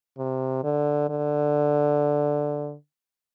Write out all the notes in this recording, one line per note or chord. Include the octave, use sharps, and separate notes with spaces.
C3
D3
D3